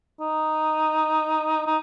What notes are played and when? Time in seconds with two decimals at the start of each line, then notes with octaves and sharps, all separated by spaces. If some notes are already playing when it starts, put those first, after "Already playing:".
0.20 D#4
1.66 D#4